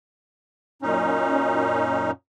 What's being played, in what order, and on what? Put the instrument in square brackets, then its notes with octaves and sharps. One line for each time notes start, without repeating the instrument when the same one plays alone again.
[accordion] F#2 A#2 C#4 D#4